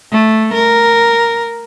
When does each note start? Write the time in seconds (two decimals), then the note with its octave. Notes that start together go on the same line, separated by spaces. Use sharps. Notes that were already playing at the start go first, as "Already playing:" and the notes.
0.12 A3
0.54 A#4